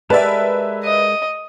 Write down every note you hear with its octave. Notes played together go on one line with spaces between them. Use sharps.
G#3 G4 A#4 B4 D5 E5 A5
D#5